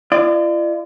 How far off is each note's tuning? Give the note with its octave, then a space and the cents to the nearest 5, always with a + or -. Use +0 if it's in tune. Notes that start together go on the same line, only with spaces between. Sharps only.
F4 -45 D5 +35